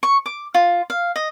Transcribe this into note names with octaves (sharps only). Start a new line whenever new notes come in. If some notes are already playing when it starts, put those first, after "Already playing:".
C#6
D6
F4
F5
D#5